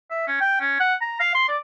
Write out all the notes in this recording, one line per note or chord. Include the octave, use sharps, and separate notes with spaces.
E5
C#4
G5
C#4
F#5
A#5
F5
C6
D5